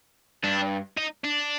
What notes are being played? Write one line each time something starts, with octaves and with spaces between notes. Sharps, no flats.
G2 D4
D#4
D4